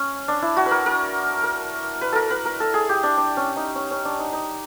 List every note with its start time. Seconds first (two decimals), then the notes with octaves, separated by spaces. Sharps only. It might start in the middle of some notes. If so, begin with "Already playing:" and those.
Already playing: C#4
0.28 D4
0.42 E4
0.56 F#4
0.66 B4
0.71 A#4
0.86 A#4
1.43 A#4
2.01 B4
2.12 A4 A#4
2.30 B4
2.45 A#4
2.60 A4
2.74 G#4
2.89 G4
3.03 D4
3.17 D4
3.37 C#4
3.56 D#4
3.75 C#4
3.91 C#4
4.05 D4
4.19 D#4
4.33 D#4